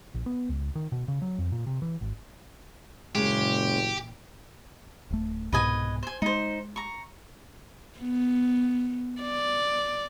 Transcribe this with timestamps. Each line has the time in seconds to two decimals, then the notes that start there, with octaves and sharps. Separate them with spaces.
0.14 A#1
0.26 B3
0.49 C#2
0.75 D#3
0.92 B2
1.08 C#3
1.22 F#3
1.38 F2
1.52 A#2
1.67 C3
1.82 E3
2.01 G#1
3.15 F#1 A#2 C#3 E3 G#3 G4
5.10 D1 A3
5.52 C2 G#2 B2 B4 D#5 G#5
6.03 C5 G#5
6.22 G#3 D#4 C5
6.76 A#5 C#6
7.99 B3
9.21 D5